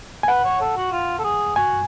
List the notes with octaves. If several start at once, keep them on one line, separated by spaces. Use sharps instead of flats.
G#5
B4 F#5
C#5
A4
F#4
F4
A4
G#4
F#4 G#5